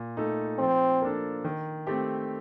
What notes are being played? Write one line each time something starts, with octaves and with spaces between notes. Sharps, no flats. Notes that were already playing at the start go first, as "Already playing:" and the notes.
Already playing: A#2
A3 D#4 A4
F3 C4
A#3 D4 A4
D#3
A3 C4 G4